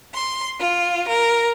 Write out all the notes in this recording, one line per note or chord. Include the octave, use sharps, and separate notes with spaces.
C6
F4
A#4